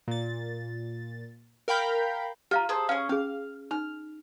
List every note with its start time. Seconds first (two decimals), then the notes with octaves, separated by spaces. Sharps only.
0.08 A#2 A6
1.68 A#4 F5 G5 B5 G6
2.51 F4 G4 F5 A#5
2.69 G#4 A4 C5
2.89 C#4 G#4 F5
3.09 C#4 G#4 F5
3.71 D#4 F6